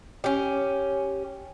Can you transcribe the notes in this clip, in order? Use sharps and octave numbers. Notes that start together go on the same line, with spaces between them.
C#4 G4